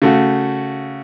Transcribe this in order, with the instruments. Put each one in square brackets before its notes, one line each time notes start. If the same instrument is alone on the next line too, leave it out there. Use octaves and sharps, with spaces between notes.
[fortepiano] C#3 A3 F#4